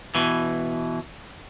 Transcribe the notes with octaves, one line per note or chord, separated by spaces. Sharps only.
B2 E3